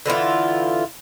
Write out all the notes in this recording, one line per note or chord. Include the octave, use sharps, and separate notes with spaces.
D3 E3 E4 F4